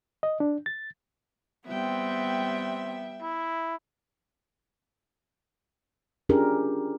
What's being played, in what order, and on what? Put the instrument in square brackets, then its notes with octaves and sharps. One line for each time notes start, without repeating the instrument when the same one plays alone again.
[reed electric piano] D#5
D4
A6
[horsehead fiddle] G3 G5 [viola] B3 [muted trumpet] C4 [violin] E5
[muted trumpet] E4
[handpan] C#4 D4 F4 G4 G#4 A#4